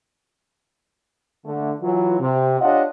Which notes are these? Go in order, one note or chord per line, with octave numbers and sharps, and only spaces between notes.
D3 A3
E3 F#3 F4
C3
D4 F4 G4 C#5 D#5 F#5